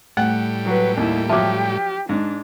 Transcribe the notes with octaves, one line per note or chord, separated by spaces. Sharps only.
A2 G3 A3 F#5
F#3 B4
D#2 A#3 E4
F3 F#3 G4 E5 D6
G#2 D4